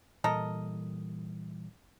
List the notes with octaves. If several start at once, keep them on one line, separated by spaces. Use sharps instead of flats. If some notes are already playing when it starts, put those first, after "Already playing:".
A#2 E3 G3 A4 A#4 D#5